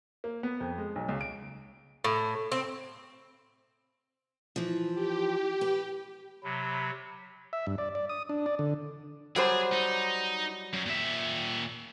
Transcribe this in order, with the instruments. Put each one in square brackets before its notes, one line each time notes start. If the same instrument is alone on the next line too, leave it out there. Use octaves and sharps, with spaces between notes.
[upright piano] A#3
B3
F2
G#3
B1
C#2
D7
[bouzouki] A2
C4
[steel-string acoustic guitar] E3 F3
[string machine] G4
[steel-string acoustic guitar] B4
[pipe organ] C3 F#3 [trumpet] B5
[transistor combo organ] E5
G2
D5
D5
D#6
D4
D5
D3
[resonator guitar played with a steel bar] F#3 G3 C5 [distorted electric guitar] G#4
[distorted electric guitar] D#4
F#2
A#2 E5